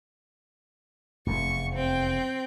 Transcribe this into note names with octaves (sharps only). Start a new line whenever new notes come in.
F1 E2 C#6
C4 G5